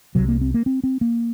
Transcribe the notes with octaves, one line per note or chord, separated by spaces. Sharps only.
C2 C3 F#3
A#3
C4
A#3
C4
C4
A#3